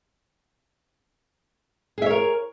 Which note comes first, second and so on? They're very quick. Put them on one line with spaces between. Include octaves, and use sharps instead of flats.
G#4 E5 C#5 A#4